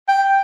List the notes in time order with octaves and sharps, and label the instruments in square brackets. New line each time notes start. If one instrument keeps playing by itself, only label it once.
[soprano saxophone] G5